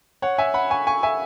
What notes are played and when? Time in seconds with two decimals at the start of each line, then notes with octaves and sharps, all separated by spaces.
0.22 C#5 F#5
0.38 E5 G#5
0.54 F#5 B5
0.70 G#5 C#6
0.87 G#5 C#6
1.03 E5 G#5